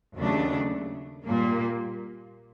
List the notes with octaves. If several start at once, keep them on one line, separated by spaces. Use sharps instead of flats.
D#2 C#3 F#3 A3 D4
A#2 G3 A#3